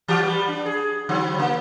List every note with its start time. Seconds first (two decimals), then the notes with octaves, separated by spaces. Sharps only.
0.08 E3 F#4 G4
0.23 G3 B4
0.48 D4
0.66 G#4
1.09 D3 F#3 C4
1.38 C#3 A#3